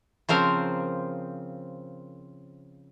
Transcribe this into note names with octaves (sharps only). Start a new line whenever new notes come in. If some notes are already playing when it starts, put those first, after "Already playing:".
C#3 F3 C4 A#4